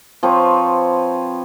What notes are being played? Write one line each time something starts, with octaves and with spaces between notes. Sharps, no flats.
F3 C4 B4 C#5